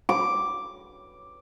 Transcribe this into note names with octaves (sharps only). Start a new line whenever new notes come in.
D6